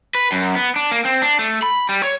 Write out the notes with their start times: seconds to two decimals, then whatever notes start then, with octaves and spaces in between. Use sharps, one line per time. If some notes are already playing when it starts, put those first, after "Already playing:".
0.15 B4
0.32 F#2
0.55 B3
0.76 D4
0.92 A#3
1.05 C4
1.22 D4
1.39 A3
1.62 B5
1.89 G3
2.03 C#5